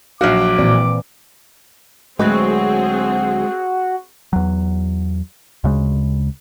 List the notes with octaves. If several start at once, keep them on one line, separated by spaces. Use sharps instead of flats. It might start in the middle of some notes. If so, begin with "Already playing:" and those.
A#1 F#3 F#4 F5 D6
A#2 E3 C4 D5
D2 F#3 G#3 C4 F#4 G#4 B4
E2 F#3
D2 C#3 G#3